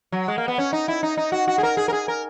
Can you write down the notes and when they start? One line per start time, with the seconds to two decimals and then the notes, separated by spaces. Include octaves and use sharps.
0.12 F#3
0.28 G#3
0.38 A#3
0.48 B3
0.58 C#4
0.73 D#4
0.88 E4
1.03 D#4
1.17 D#4
1.32 F#4
1.48 F#4
1.58 G#4
1.63 A#4
1.77 G#4
1.88 A#4
1.93 G#4
2.08 A#4